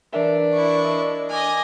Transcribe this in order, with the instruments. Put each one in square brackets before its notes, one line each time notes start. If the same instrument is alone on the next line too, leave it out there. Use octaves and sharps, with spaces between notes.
[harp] E3 A#4 E5 [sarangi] D4
[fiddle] E4 C#6
[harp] D#5 E6
[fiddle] D#5 G#5 [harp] D6 F6